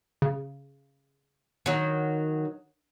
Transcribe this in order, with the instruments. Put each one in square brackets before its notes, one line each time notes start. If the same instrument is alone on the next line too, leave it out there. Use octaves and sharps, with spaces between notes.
[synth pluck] C#3
[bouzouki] D#3 F#3